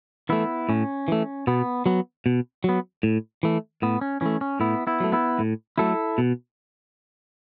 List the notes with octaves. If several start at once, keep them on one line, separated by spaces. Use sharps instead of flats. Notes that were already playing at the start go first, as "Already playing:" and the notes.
E3 A3 B3 E4
A2 C#4
E3 A3
B2 B3
F#3 B3
B2
F#3 B3
A2
E3 A3
A2 B3
C#4
E3 A3 C#4
C#4
A2 B3 E4
B3 E4
F#3 A3
B3 E4
A2
F#3 A3 E4 A4
B2